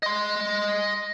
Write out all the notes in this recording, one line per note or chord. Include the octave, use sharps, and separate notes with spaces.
D#5 C6